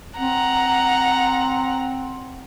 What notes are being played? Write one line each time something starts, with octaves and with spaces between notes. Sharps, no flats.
C4 F#5 A#5